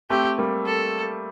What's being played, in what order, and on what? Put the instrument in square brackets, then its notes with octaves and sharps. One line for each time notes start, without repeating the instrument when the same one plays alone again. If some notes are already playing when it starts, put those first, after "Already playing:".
[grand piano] A3 C4 [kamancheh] G4
[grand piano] G3 A#3
[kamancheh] A4